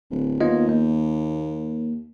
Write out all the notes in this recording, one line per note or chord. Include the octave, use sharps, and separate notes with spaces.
D1
D#2 B3 F4 D#5
A#3